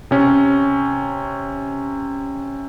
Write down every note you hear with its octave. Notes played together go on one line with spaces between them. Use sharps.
C3 C#4